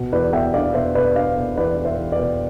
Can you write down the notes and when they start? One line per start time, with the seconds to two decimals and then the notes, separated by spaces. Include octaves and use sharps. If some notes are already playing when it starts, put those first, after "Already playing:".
Already playing: B2
0.12 E2 B4 D5
0.33 B3 E5 G5
0.54 D4 D5 F5
0.74 B2 C5 E5
0.95 B2 B4 D5
1.15 D4 D5 F5
1.37 B2
1.57 E2 B4 D5
1.78 E2
1.85 C5 E5
1.99 E2
2.12 B4 D5
2.19 B2